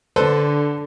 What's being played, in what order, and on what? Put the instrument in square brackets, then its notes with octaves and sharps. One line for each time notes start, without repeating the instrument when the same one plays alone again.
[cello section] D3 [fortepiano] A4 B4 C5